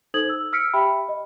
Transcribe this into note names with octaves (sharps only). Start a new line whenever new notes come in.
D#4 A4 C5 D#6 G#6 F#7
E6
E6 F6 B6 C#7 D7
G4 E5 G5 B5
D#5